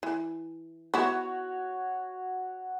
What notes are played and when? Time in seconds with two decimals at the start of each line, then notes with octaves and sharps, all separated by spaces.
0.03 E3
0.94 B3 E4 F#4 C#5